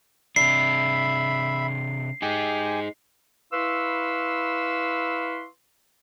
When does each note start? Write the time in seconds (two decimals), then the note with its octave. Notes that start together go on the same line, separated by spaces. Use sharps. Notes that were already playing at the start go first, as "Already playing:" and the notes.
0.36 C3 D4 E5 B5 C7
2.22 D#4 G4 G#4 G#5
3.52 E4 B4 F5 C6 C#6 E6